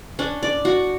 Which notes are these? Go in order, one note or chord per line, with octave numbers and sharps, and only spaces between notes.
C#4 D4
D5
F#4